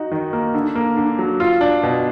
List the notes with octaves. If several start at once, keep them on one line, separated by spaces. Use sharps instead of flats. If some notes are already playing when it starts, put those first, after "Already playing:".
Already playing: D#4 F#4
D#3
A#3
D3
A#3
D3
F#3
F4
D4
B2